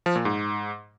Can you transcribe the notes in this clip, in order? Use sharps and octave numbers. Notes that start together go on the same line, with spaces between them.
F3
A#2
G#2